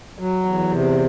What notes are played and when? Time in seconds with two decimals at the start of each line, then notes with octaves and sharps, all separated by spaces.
0.19 F#3
0.44 E2
0.71 C3